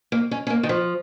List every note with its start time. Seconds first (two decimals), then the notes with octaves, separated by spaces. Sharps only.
0.12 A#3
0.31 C#4
0.47 C#4
0.50 A#3
0.63 D#3
0.69 F3